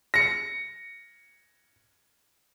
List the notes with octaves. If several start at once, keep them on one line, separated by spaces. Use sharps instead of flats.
A#6 C#7